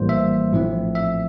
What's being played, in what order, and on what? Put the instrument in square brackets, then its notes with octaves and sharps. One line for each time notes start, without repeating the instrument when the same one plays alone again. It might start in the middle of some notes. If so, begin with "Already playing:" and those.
Already playing: [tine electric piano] A#1 A2 E3 G3 A#3 C5
E5
A#1 A2 F3 A3 C4
E5